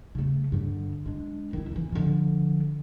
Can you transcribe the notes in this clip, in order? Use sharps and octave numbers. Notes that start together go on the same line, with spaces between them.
C#3 A3
G2 D3
G#3 D4
D#3 E4
E2 E3
D3 F3